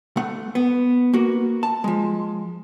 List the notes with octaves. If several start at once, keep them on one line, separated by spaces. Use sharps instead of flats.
A3 F#5
B3
A#3 F#4
A5
F3 G#3